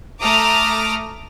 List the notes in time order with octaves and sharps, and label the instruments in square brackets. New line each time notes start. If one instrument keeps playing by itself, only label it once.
[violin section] A3 A#5 D6 D#6 F6